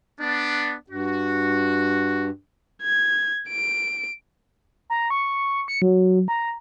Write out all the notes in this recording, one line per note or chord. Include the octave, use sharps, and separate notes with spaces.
B3 D4
G2 F#4
G#6
D7
A#5
C#6
C#7
F#3
A#5